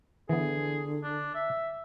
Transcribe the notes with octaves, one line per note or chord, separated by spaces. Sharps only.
D3 E3 B3 G#4
D4
E5